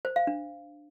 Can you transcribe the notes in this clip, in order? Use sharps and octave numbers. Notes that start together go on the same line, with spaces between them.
C5
F5
D4